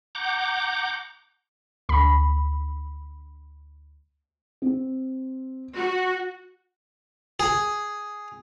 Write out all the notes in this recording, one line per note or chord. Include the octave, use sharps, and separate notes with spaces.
F#5 A#5 D6 G6
D2 B5
C4
F#4
G#4